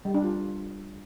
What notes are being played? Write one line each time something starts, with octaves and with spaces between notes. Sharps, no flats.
G3
D4
F4